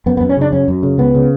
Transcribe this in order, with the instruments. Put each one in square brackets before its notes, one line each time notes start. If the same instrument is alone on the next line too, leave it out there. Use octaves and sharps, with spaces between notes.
[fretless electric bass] F#2 B3
B3
F#2
C#4
C#3 D4
F#2 C#4
F#2
C#3
C#2 B3
C#3